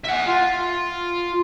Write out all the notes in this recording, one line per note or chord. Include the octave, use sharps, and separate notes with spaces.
E5 F#5
F4